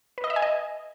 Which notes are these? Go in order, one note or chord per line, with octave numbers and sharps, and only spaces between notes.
B4
D#5
E5
G#5
D#5